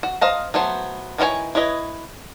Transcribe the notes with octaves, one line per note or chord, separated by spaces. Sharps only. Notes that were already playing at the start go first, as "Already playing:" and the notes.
F#4
C5 D#5 F5 A#5
F#3 A3 B3 C5
D#3 E3 F4 C#5 G#5
E4 B4 C#5 D#5